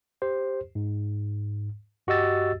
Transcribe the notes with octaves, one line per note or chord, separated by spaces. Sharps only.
G4 C5
G#2
G2 F#4 G4 D#5 E6 A6